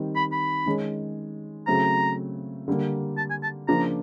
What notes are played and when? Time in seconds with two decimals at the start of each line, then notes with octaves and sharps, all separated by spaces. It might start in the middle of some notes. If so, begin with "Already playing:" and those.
Already playing: D#3 G3 C4
0.16 B5
0.32 B5
0.66 D#3 G#3 C#4
1.67 C#3 F#3 A3 C4 A#5
2.68 D3 G3 A#3
3.18 A5
3.30 G#5
3.43 A5
3.68 C#3 F3 A#3 D4 A#5